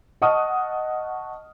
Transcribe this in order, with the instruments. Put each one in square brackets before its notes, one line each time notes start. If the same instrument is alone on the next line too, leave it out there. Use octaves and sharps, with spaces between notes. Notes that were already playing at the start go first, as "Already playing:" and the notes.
[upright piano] D#5 F#5 A5 C#6 D#6 F6